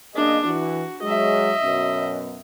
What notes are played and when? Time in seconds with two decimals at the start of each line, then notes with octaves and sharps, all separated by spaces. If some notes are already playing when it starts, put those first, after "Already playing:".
0.14 F#2 A#3 D4 G#4 D#5
0.46 E3 F#4
1.03 F#3 G#3 D#5 E5
1.63 F#2 B2